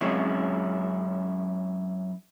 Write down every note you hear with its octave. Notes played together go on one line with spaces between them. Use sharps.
F#2 G#3 C4 C#4 E4